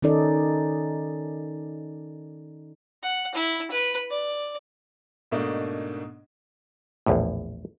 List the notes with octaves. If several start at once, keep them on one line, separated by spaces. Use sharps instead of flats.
D#3 C#4 D#4 A4 D5
F#5
E4
B4
D5
G#2 B2 A3 A#3 D4 D#4
A#1 E2 A2